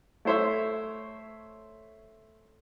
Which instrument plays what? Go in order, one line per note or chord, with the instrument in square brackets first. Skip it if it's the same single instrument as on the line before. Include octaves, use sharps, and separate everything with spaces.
[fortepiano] A3 E4 C5 C#5 E5